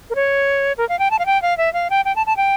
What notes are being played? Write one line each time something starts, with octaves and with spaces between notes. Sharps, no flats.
A#4
C#5
A#4
F5
G5
A5
F5
G5
F5
E5
F5
G5
G5
A5
A5
G5